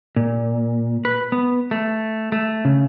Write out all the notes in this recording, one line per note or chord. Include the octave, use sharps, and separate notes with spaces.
A#2
B4
B3
A3
A3
C#3